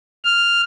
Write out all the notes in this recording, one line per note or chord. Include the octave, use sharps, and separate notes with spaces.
F6